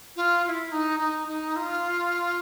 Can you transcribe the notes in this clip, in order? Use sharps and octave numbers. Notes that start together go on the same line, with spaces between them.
F4
F4
E4
D#4
D#4
D#4
F4